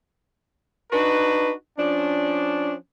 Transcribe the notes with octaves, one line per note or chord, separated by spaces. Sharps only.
D4 D#4 F#4 B4
F3 C#4 D4